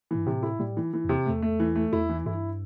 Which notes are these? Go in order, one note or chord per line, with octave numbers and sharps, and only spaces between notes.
G2 E3
A2 C3
E4
A2 G3
E3
E3
E2 C3
E2 A3
A3
E3
A3
E2 E4
E3
G2 E4